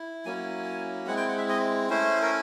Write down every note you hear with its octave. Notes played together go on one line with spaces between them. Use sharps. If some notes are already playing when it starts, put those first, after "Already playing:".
Already playing: E4
F#3 A#3 C#4 E4 G#5
G#3 C4 E4 F#5
G5
F#5
E5
D#5
A3 C#4 E4 C5
A#4